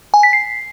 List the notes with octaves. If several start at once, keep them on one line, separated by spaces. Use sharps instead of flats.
G#5
B6
C7